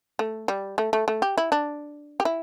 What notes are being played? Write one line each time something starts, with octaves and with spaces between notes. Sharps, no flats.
A3
G3
A3
A3
A3
G4
E4
D4
G4
E4